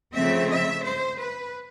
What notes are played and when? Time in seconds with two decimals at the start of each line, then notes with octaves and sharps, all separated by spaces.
0.13 C#3 F3 A3 C4 E5
0.49 E5
0.84 C5
1.19 B4